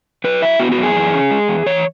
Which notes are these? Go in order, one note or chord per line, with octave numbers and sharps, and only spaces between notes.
F#3 B4
E4 E5
B3 F#4
F#4
F#2
G#4
E3
C#4
G#3
E2
E3 C#5